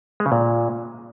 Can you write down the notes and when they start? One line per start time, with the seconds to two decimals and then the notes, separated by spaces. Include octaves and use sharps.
0.20 G#3
0.26 C#3
0.32 A#2